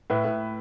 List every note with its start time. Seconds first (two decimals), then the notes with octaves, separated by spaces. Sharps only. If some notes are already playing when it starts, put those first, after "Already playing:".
0.10 A2 B4 E5
0.25 A2